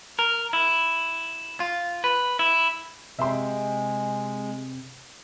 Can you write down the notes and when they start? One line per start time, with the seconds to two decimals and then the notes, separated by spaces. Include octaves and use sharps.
0.19 A#4
0.53 E4
1.60 F4
2.04 B4
2.39 E4
3.19 C3 G#3 C4 G4 E5 C6